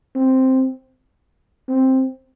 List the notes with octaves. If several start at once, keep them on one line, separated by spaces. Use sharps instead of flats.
C4
C4